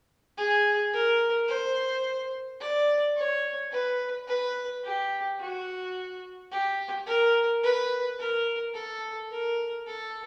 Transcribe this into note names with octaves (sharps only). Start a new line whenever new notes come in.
G#4
A#4
C5
D5
C#5
B4
B4
G4
F#4
G4
A#4
B4
A#4
A4
A#4
A4